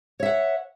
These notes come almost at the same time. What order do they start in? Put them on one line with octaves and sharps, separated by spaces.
C#5 E5 F#5